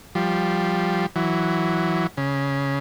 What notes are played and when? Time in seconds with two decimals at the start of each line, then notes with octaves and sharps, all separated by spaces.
0.15 F3 G3
1.16 E3 F#3
2.17 C#3